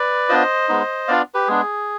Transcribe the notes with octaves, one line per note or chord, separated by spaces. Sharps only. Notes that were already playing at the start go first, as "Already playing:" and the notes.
Already playing: B4 D5
B3 D4 F4 C5 D#5
G#3 B3 D#4
B3 D4 F4 D5 F5
G4 B4
G#3 B3 D4 G#4